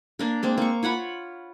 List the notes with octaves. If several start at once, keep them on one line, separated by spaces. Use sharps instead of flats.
A#3 D4 A#4
G#3 A#3 C4
A#3 C#6
F4 C#5 F#5 B5